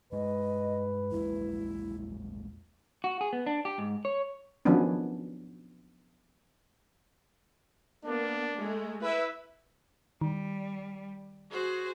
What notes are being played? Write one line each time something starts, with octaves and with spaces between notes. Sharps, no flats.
G2 G#3 B4 D#5
A#1 E2 G#3 E4
F#4
G#4
B3
D4
G4
G#2
C#5
D#3 F3 F#3 B3 C#4 D4
A#3 B3 D4
G#3 A3
E4 B4 E5
D#3 G3
F#4 G#4 C5